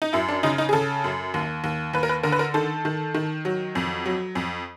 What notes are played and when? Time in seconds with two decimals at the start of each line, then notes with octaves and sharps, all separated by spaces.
0.02 D#4
0.13 F#2 E4
0.29 D4
0.43 C#3 D#4
0.58 D#4
0.69 G#4
0.73 C#3 A4
1.04 F#2
1.34 D#2
1.64 D#2
1.94 D#2 B4
2.03 A#4
2.09 B4
2.23 D3 A#4
2.32 B4
2.39 A#4
2.54 D#3 A4
2.85 D#3
3.14 D#3
3.45 F#3
3.75 F2
4.06 F#3
4.35 F2